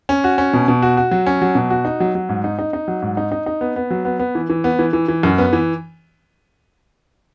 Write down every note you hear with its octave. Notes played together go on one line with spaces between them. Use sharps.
C#4
F#4
C#4
B2
B2
F#4
F#4
F#3
C#4
F#3
B2
F#4
D#4
F#3
F#3
G#2
D#4
D#4
D#4
F#3
G#2
D#4
D#4
D#4
B3
B3
F#3
B3
B3
E3
E3
B3
E3
E3
E3
F#2
B3
E3